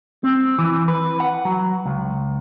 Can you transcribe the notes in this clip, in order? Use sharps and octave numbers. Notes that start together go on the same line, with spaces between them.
C4
E3
B4
F#5
F#3
C#2